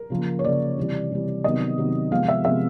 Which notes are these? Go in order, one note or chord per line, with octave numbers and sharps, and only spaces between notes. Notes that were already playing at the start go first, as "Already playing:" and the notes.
Already playing: A#4
C#3 F3 A#3
C#5
C#3 F3 A#3 D5
C3 E3 G3
C3 E3 G3
C3 D#3 F#3 B3 D#5
C3 D#3 F#3 B3
C3 F3 G#3 B3 F5
E5
C3 F3 G#3 B3 E5